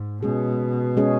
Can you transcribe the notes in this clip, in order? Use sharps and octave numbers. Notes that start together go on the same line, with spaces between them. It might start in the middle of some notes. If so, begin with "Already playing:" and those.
Already playing: G#2
B2 G#3 C#4 G#4
G#3 C#4 G#4